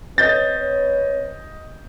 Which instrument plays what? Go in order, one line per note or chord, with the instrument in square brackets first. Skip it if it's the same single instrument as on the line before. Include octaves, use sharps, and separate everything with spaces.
[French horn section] C4 B4 C#5 [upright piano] D#5 G6 A6